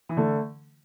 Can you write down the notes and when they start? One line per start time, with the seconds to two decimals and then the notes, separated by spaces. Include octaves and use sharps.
0.09 E3
0.17 D3 A3